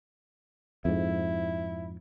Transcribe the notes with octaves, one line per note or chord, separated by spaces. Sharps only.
F2 G#2 E4